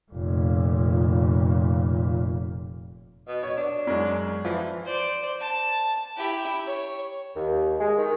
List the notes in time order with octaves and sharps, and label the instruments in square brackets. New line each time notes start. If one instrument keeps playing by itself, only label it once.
[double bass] F1 A#2
[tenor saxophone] B2
[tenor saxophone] B2 [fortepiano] C#5
[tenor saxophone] D4
[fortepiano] F#2 G#3
[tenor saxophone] E3 [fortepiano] F3
[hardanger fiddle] C5 D5
A5
E4 G4
C#5
[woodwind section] D#2
G#3
D#3